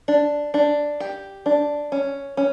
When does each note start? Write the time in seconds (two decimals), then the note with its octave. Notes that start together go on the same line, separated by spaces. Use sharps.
0.08 D4
0.54 D4
1.00 G4
1.46 D4
1.92 C#4
2.37 C#4